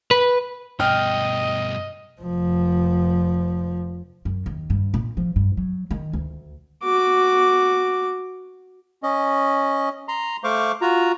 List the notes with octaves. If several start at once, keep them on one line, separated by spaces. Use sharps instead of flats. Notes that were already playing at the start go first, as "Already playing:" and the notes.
B4
G2 B2 D#5 G5 F6
F1 F3
F#2
D#2
G2
A#2
F3
G2
F#3
D#3
D2
F#4 D6
C#4 D#5
A#5 C6
A3 C5 F5 C#6 D6
F4 F#4 A#5